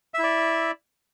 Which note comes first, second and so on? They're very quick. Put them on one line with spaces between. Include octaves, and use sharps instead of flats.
E5 E4 D5